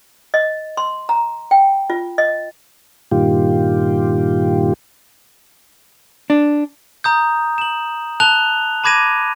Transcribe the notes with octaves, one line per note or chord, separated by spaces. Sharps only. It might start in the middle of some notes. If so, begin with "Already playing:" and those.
D#5
C6
A#5
G5
F4
D#5
G2 A#2 D#3 F4 G4
D4
A#5 D#6 G6
E7 F#7
A5 F#6 F7 G7
A5 B5 D6 G#6 A#6 D#7